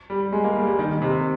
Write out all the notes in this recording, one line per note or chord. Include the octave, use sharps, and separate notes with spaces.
G3
G#3
A#3
G3
G3
D#3
C3